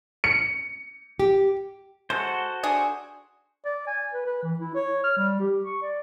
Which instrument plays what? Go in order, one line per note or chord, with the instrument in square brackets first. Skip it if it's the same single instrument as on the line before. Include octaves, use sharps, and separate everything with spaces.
[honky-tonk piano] C#7
[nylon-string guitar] G4
[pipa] G#3 [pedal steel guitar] F#4 A4 C5
[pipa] D4 G#4
[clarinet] D5
G#5
B4
B4
E3
E4
C#5
F6
G3
G4
C#6
D5